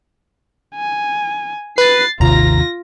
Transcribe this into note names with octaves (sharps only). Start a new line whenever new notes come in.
G#5
B4 A6 C7
G#1 D#2 C3 D#3 F4 A#5 A#6